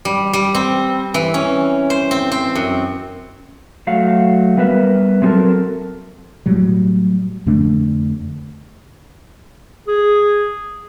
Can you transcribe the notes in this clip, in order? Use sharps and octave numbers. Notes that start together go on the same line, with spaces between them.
G3
G3
C4
E3
C#4
C5
C4
C4
F#2
F#3 A3 F5 F#5
G3 B3 A#4 B4 E5
F#3 C4 D#4 F#4 A4 A#4
A2 F#3 G3
F2 D3 A3 D4
G#4